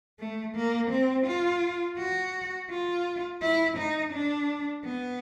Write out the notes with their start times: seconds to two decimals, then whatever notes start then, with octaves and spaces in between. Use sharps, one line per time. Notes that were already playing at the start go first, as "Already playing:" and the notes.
0.20 A3
0.55 A#3
0.91 C4
1.27 F4
1.98 F#4
2.70 F4
3.42 E4
3.78 D#4
4.13 D4
4.85 B3